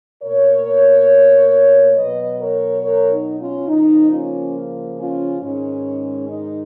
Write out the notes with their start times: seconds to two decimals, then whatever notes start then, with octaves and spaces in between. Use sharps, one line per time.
0.23 B2 A#3 A#4 C#5
1.96 B2 F#3 B3 B4 D#5
2.39 A#4 C#5
2.82 A#4 C#5
3.11 D#4
3.40 C#4 F4
3.68 C#3 F3 A#3 D#4
4.11 C#4 F4
4.99 C#4 F4
5.42 G#2 D#3 G#3 C#4
6.28 D#4